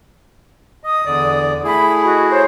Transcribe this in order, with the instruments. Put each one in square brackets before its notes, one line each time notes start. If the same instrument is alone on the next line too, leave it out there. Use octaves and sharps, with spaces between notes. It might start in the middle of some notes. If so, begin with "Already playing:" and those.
[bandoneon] D#5 [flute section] D#6
[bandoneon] E2 D3 D5
[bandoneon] A3 E4 G#4 [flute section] B5
[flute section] F#4 D#5
C5 C#5